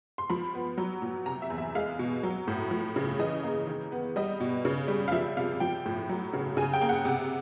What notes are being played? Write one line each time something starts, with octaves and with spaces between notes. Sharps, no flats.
C6
F3 B5
B3
F#3
A#2
C3 A#5
E5
E2
E5
G#3 F5
B2
F#3
A2
F3
C#3
E3 D#5
A#3
D#3
B3
G3 D#5
B2
C#3
G3
F5
F3 E5
C3 F5
F3 G5
A2
F#3
C#3
C#3 G#5
G5
A#3
F#5
C3